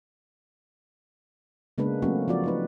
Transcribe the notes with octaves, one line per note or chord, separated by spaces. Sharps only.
C#3 G#3 A#3 B3 D4 B4
F#3 A3 A#3 C4 C#4 F#4
F3 C4 F4 F#4 D5
A3 D#4 B4